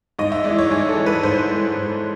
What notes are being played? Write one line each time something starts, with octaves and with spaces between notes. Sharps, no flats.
G#2 D#5
E5
E3 G#3 D5
C#5
G#2 G#4
A4
E3 G#3
B4
G#2 C5
E3 G#3
G#2